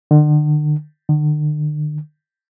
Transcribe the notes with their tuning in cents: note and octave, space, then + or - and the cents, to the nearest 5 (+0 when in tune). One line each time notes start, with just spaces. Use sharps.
D3 +40
D3 +45